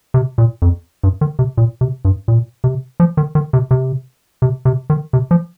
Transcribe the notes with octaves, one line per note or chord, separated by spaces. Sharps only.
C3
A#2
F2
G2
D#3
C3
A#2
C3
G2
A#2
C3
F3
D#3
D#3
C3
C3
C3
C3
D#3
C3
F3